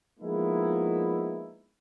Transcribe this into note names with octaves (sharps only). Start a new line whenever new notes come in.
F3 G#3 A#3 B3 D#4 E4